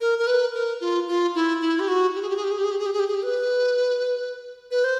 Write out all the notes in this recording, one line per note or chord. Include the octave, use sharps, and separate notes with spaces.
A#4
A#4
B4
A#4
F4
F4
E4
E4
G4
F#4
G4
G#4
G4
G#4
G4
G#4
G4
G#4
G4
G#4
G4
G#4
G4
G#4
G4
B4
B4
C5